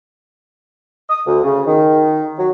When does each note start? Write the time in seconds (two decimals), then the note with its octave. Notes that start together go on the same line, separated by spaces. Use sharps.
1.10 D#6
1.26 D2
1.44 C#3
1.67 D#3
2.38 F#3